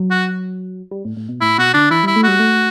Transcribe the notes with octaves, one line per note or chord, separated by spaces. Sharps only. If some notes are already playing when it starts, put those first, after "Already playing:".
Already playing: F#3
F#4
G3
A2
A2
B2
A2 E4
B2 F#4
D3 D4
E3 E4
G3 E4
A3
G3 F#4
A3